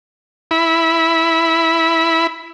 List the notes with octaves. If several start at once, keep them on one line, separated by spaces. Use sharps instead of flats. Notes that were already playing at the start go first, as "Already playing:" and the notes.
E4 B5